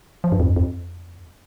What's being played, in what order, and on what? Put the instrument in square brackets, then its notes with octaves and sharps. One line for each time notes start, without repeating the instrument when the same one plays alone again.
[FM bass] F3
G2
F2
G2
F2